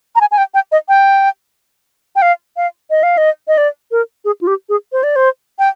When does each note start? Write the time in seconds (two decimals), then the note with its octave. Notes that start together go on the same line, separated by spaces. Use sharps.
0.16 A#5
0.21 G#5
0.31 G#5
0.38 G5
0.54 G5
0.72 D#5
0.89 G5
2.16 G5
2.22 F5
2.57 F5
2.90 D#5
3.03 F5
3.18 D#5
3.48 D#5
3.58 D5
3.91 A#4
4.25 G#4
4.41 F4
4.47 G4
4.69 G#4
4.92 C5
5.03 D5
5.16 C5
5.59 G5